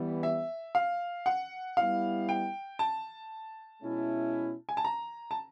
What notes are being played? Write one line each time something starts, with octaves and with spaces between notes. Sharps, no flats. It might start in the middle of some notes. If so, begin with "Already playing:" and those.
Already playing: E3 G3 B3
E5
F5
F#5
G3 B3 E4 F5
G5
A5
B2 G#3 C#4 E4
G#5
A5
A#5
A5